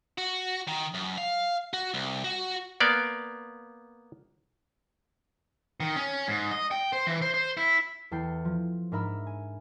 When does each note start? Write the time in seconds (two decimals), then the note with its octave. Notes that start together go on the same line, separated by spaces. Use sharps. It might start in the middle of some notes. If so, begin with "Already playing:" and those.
0.18 F#4
0.68 D#3
0.94 F#2
1.18 F5
1.74 F#4
1.94 C2
2.24 F#4
2.80 A#3 B3 D5
5.80 D#3
5.96 C#4
6.28 G#2
6.51 D#5
6.71 G5
6.93 C5
7.07 E3
7.22 C5
7.34 C5
7.57 E4
8.11 E2 A4 G5 C7
8.45 F3
8.92 G#2 D4 A#4 E5 B5 E6
9.27 G#5